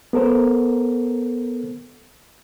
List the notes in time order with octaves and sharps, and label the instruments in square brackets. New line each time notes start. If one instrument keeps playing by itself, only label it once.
[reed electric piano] B3 A4 A#4 C5